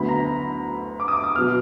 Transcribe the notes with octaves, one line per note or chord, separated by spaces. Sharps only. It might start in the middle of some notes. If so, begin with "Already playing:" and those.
Already playing: D2 D3 F#3 B3 B5
A#5
D6
D#6
D6
D#6
B2 F#3 B3 F6